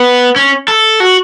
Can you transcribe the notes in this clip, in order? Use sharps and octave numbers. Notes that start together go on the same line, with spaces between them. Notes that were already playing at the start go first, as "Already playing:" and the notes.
Already playing: B3
C#4
A4
F#4